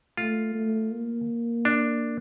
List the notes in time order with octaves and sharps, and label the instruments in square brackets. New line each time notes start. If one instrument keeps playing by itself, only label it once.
[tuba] A3 [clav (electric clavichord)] F4
[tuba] A3
A#3
[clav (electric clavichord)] D4